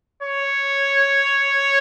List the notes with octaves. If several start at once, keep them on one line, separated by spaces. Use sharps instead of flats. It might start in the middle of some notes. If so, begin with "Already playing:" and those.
C#5